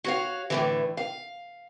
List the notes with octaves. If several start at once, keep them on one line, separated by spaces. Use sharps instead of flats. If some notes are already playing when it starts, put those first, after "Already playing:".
F#4 C#5 F5
A2 D3 E3
F5